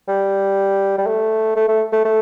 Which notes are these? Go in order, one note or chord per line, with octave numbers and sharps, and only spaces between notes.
G3
G3
A3
A3
A3
A3
A3